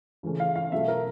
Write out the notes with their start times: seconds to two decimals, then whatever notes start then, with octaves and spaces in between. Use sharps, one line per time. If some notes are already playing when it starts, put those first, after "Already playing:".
0.23 C#3 E3 A3 C#4
0.40 F5
0.56 F5
0.72 B2 F#3 A3 E5
0.88 A#4